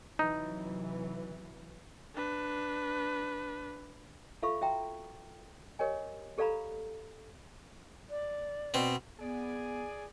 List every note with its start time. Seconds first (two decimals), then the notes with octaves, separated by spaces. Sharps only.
0.19 C3 E3 F#3 D#4
2.15 D4 B4
4.43 F4 A4 E5 F5 B5 C#6
4.61 F#4 E5 G5 A#5
5.79 G4 A#4 C#5 D#5 G#5
6.38 G4 A4 D5 F5 A#5 B5
8.10 D5
8.74 B2 C4
9.20 B3 G#4 D5 G#5